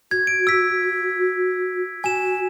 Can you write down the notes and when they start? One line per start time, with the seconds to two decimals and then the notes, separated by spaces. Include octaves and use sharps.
0.11 F#4 G#6
0.27 D7
0.47 E6 B6
2.04 F#4 G#5 E7